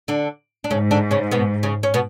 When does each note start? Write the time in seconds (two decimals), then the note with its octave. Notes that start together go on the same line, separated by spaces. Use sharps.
0.08 D3 D4
0.64 D4
0.71 G#2 C#3 C#4
0.91 D3 D4
1.11 C#3 C#4
1.31 B2 B3
1.63 C#3 C#4
1.83 C#4
1.94 B2 B3